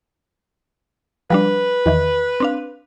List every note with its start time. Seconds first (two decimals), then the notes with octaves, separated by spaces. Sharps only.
1.30 F3 G3 D4 B4
1.86 E2 D#3 E3
2.40 C4 D4 F5